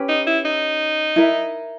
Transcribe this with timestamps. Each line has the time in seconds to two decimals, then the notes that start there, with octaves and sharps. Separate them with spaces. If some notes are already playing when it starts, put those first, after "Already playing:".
Already playing: C#4 G4 B4
0.08 D#4
0.27 E4
0.45 D#4
1.16 E4 A#4 E5